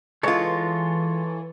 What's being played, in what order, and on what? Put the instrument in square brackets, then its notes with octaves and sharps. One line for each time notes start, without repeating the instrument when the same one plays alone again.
[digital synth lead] E3 [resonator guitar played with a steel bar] G#3 F4 [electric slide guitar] A4 C#5